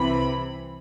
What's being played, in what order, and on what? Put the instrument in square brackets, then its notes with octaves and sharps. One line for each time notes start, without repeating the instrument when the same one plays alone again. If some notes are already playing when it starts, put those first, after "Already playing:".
Already playing: [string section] C2 C3 E3 B5